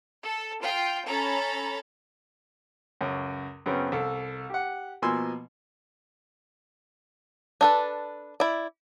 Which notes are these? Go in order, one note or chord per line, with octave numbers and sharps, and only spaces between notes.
A4
F4 G5
C#4 A4 A#5 B5 A6
C#2 F#2
F#2 C#3 B3 C4
C2 A4
G4 F#5
B2 F3 A#3 G#5 C6 E6
D4 A4 B4
E4 D5